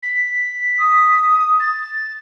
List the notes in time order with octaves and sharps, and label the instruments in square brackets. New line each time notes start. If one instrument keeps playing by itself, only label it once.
[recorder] B6
[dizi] D#6
[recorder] A6